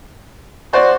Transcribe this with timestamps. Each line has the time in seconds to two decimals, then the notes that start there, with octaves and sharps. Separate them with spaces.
0.73 F#4 C5 D5